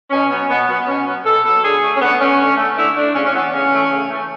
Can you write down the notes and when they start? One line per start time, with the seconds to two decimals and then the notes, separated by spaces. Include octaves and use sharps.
0.11 B2 C#4
0.29 F#3 B3 C#4
0.48 B2 B3
0.67 F#3 B3
0.87 B2 C#4
1.06 F#3 B3
1.25 B2 A4
1.44 F#3 B3 A4
1.62 D3 G#4
1.81 A3
1.96 C#4
2.00 D3 B3
2.19 A3 C#4
2.38 D3
2.57 A3
2.76 D3 E4
2.95 A3 D4
3.14 C#3 C#4
3.24 C#4
3.33 E3 A3 B3
3.52 C#3 C#4
3.70 E3 A3
3.89 C#3
4.09 E3 A3